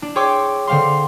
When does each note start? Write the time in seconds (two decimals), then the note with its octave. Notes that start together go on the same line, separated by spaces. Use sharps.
0.02 D4
0.15 G#4 C#5 G5 C6 D6 E6
0.67 D3 C4 F5 C6